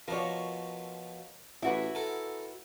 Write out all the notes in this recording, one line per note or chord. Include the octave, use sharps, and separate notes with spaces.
B2 F3 A#4 C#5
A1 E4 F#4 B4
A4 A#4